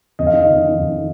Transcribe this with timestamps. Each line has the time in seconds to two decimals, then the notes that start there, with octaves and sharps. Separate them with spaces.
0.19 F2 D#5
0.27 F5
0.33 D#3 D#5
0.47 F2
0.62 D#3
0.78 F2
0.92 D#3